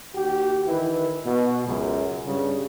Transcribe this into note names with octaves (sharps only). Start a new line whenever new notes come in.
D#2 F#4 G4
D#3 E3 E4 B4
B2
C#2 F#2
G2 C#3 G3